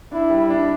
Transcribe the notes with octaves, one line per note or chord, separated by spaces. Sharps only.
D4 E4
G3
D4